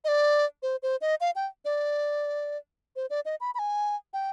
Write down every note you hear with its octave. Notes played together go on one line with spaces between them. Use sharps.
D#5
D5
C5
C5
D#5
F5
G5
D5
C5
D5
D#5
B5
B5
G#5
G5